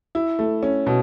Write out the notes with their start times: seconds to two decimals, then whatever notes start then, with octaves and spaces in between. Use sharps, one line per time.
0.15 E4
0.39 A3
0.63 C#4
0.86 B2